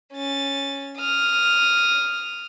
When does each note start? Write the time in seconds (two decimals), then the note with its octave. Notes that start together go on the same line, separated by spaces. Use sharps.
0.14 C#4 A6
1.00 D#6 F6